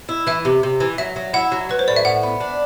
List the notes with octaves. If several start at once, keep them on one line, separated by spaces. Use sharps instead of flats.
E4
E3 E5
C3
C3
E3
F#3 E5
F#3
E4 F#5
F#3
F#3 B4
C5
A2 D5
E5
A2 F#5
B3
D4